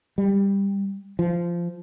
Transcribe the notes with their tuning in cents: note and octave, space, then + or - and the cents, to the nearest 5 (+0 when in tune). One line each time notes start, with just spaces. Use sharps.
G3 +15
F3 -15